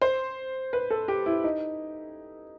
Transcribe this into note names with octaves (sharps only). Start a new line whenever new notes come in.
C5
B4
A4
G4
E4
D#4